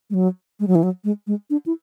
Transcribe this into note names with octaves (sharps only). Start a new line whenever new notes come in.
G#3
F#3
G#3
F#3
E3
F#3
G#3
G#3
D4
E4